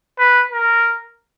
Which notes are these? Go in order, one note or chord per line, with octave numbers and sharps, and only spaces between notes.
B4
A#4